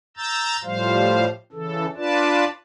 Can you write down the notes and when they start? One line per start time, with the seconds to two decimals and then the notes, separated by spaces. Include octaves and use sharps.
0.17 A#5 E6 G6 A6
0.64 A2 F3 G3 C5 F5
1.52 C#3 E3 A4
1.96 D4 F4 B4 D5 A5